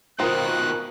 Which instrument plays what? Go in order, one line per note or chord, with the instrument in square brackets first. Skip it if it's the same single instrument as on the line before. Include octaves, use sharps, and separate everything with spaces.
[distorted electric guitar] B2 D#3 [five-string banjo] C4 [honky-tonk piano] F4 A#4 D#6 [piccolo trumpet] F#6